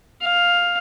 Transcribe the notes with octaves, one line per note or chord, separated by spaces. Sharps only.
F5